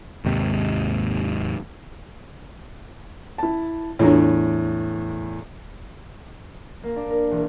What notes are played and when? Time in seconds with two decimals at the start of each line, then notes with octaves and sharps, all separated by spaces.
0.25 D#2 G#2 C3
3.38 E4 A5
3.99 E2 A2 D4 F4 C#5
6.83 A#3
6.96 D4
7.10 A#4
7.31 E1